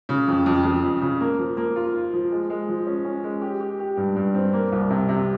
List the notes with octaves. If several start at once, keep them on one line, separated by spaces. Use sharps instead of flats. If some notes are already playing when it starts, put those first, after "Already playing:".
C#3
F2
F2
F2
F2
C#3
A#3
F3
A#3
F4
F4
F3
G#3
G#3
F3
C#4
C#4
G#3
G4
G4
G4
G2
G2
C4
A#3
C2
C3
C3